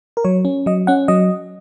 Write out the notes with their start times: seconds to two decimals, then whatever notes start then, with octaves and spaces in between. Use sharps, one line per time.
0.17 A#4
0.24 F#3 C#5
0.45 C#4
0.66 F#3 D#5
0.87 C#4 F#5
1.08 F#3 D#5